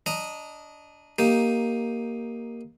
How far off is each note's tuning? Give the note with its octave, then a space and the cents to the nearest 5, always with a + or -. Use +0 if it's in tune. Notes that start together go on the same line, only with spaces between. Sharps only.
D4 -20 D#5 +0 A#5 +0
A#3 +0 D#4 +5 G4 +0